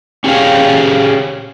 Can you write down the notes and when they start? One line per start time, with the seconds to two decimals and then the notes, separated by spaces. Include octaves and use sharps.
0.24 C#4 G4 G#4 C#5 F5